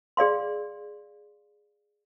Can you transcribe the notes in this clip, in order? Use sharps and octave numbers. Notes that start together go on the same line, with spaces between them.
G#4 D5 F5 C6